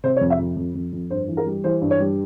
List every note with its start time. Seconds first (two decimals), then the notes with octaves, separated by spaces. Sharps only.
0.04 C3 C5
0.17 C#5
0.21 F2
0.30 E5
0.39 F2
0.57 F2
0.75 F2
0.92 F2
1.10 G2 C5
1.28 E3
1.37 A#4
1.46 G3
1.64 E3 C5
1.82 G2
1.91 C#5
2.00 G3